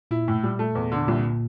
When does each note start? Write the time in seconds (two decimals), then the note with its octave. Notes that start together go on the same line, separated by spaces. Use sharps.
0.11 A#2 E4
0.28 A2
0.44 G3
0.59 A3
0.75 E2
0.92 D3
1.08 C2 A#2